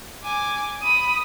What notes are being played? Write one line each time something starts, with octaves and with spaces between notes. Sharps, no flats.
G#5 D6
B5 D#6